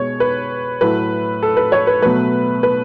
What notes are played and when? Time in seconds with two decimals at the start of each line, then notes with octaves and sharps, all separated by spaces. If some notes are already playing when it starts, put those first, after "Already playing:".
Already playing: B2 G#3 C#5
0.20 B4
0.81 A2 F#3 A3 B4
1.43 A4
1.57 B4
1.72 C#5
1.87 B4
2.02 B2 F#3 A3 B4
2.63 B4